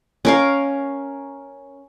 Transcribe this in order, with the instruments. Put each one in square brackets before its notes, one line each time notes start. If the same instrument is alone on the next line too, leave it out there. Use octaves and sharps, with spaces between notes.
[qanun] C#4 A#4 F5